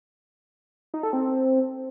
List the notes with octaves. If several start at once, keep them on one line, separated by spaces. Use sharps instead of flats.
D#4
A4
C4